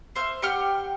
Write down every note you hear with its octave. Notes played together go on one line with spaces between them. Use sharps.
C5 E5 F6
G4 F#5 G5 F6